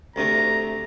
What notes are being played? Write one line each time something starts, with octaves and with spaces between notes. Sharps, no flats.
D2 C3 A3 A#5